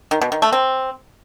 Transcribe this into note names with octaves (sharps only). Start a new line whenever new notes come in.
D#3
B2
D#3
A3
C4